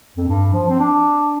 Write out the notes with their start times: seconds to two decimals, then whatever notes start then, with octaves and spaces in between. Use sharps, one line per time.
0.17 F2
0.28 G2
0.53 F3
0.69 C4
0.79 D4